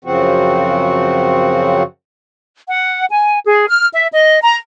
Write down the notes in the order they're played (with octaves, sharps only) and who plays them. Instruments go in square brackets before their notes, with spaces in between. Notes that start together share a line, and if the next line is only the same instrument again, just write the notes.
[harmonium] F#2 C#3 F3 C4 F#4
[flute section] F#5
G#5
G#4
F6
E5
D#5
A#5